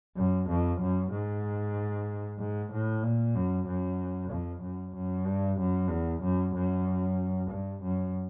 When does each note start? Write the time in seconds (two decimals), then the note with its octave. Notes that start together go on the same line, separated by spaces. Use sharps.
0.16 F#2
0.49 F2
0.81 F#2
1.12 G#2
2.40 G#2
2.72 A2
3.03 A#2
3.35 F#2
3.67 F#2
4.31 F2
4.63 F#2
4.95 F#2
5.27 G2
5.59 F#2
5.90 E2
6.23 F#2
6.54 F#2
7.50 G2
7.82 F#2